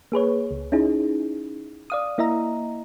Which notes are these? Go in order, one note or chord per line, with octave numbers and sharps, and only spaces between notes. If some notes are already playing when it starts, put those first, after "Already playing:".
A#3 G#4 B4 C#5
C#2
C#4 D#4 E4 G#4
D5 F5 D#6
A#3 E4 D#5 E5 A#5